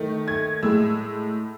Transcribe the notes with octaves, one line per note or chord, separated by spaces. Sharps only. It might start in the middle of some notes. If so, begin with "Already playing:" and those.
Already playing: D#3 A3
G#6
A2 G#3 E6